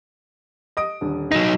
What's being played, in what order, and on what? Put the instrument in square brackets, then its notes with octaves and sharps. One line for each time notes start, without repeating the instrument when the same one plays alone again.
[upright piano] D#5 D#6 D7
D#1 D3
[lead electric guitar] F#3 D#4 [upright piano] A#6 E7